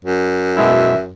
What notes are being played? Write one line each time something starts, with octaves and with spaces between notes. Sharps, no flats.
F#2
B2 G#3 E4 E5